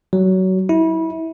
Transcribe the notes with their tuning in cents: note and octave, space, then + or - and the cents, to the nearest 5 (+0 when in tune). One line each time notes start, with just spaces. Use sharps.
F#3 +20
E4 -25